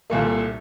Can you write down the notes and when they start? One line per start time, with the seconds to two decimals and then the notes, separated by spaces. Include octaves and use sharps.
0.10 C2 A#2 A3